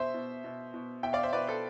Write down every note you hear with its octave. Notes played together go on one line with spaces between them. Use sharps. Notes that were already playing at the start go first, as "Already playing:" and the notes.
Already playing: B2 C5 E5
B2
B2
B2
B2 E5 G5
D5 F5
C5 E5
B2 B4 D5
A4 C5